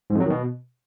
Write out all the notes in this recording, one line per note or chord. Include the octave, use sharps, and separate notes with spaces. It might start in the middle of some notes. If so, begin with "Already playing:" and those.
G#2
F2
F#3
D#3
B2